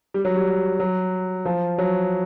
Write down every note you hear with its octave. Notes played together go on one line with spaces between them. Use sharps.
G3
F#3
G3
F#3
F3
F#3